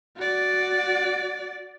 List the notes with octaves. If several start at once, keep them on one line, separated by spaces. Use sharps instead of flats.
F#4 D5